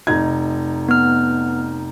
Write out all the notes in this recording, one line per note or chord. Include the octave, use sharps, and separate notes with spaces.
F1 D#4 G#6
B3 F6